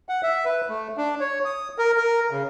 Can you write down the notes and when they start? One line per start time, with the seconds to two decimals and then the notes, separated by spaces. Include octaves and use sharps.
0.09 F#5
0.23 E5
0.45 B4
0.69 A3
0.97 D4
1.20 C#5
1.45 D#6
1.78 A#4
1.98 A#4
2.31 C#3